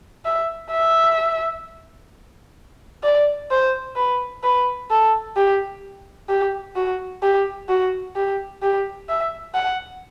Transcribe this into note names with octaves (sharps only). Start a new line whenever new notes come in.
E5
E5
D5
C5
B4
B4
A4
G4
G4
F#4
G4
F#4
G4
G4
E5
F#5